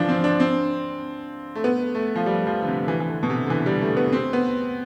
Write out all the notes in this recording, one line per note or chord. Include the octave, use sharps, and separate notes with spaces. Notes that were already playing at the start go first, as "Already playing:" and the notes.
Already playing: D3 E3 F3 D4
C4
D4
C4
A3
B3
A3
F3
G3
F3
D3
C3
E3
E3
D3
B2
C3
D3
E3
G3
A3
B3
C4
B3